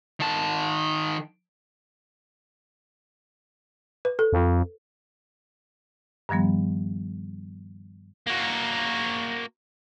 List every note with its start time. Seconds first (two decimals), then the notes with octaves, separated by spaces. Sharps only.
0.20 D#3 A5
4.05 B4
4.19 A4
4.33 F2
6.29 G2 D#3 F3 G3 B3
8.27 A#3 F#4